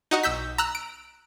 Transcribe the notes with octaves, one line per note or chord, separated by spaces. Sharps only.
D#4 F#4 D#5
B1 E6 G6 B6
A#5 E6 F#6
D7